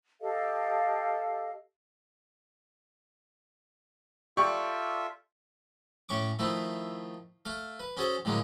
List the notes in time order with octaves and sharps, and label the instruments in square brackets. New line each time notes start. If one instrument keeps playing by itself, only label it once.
[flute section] G4 A4 D#5 F5
[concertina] F4 A4 E5 [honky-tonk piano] G4 D5 C#6
[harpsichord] A2 C#4 C#6 D6
D#3 F3 A3 E4
A3 F5
B4
C#4 F#4 G#4 A4 C5
A2 D3 F#3 G#3 A#3